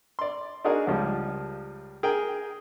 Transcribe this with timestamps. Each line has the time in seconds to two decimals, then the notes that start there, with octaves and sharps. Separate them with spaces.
0.19 D5 C6
0.64 D4 D#4 F#4 G#4 A#4
0.87 C#2 F3 G3
2.03 G#4 A#4 G5